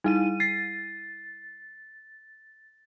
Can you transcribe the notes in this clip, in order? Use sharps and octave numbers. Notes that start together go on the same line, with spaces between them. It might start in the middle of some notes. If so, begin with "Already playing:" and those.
G3 D#4 E4 D#7
A6 C7